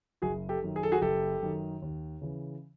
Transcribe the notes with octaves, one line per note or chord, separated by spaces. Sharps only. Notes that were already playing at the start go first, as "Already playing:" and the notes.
F#1 F#4 G#4
G4 A4
F#2 D#3
G#4
A4
F#4 G#4
F#1 G4 A4
F#2 D#3
D#2
C#3 E3